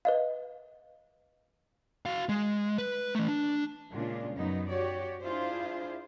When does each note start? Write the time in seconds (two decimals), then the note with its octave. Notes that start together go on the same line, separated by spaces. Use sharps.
0.05 B4 D#5 F5
2.06 F#4 F5
2.29 G#3
2.78 B4
3.15 E3 A3
3.28 D4
3.91 A#2 C#3 G#3 D4 F4
4.36 F#2 F#3 B3 D#4
4.69 F#4 G4 C#5 D5
5.23 D4 E4 F4 G#4 C5